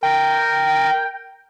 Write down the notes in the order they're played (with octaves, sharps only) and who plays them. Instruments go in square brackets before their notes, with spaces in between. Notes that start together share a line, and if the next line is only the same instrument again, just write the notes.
[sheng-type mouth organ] A#4 [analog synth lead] G5